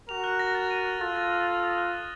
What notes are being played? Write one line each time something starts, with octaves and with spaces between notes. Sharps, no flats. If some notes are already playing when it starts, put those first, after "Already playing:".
F#4 A#4 F7
F#6
A#6
A6
D#7
F6
F4 A4 A6
A6
F6
F#6
D#6
F#6
A6